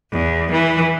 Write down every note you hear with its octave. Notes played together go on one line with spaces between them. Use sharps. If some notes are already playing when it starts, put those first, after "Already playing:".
E2
E3